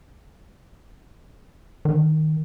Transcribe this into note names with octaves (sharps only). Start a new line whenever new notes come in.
D#3